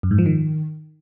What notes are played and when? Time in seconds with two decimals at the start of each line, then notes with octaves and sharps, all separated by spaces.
0.03 F#2
0.11 G#2
0.18 F3
0.26 D#3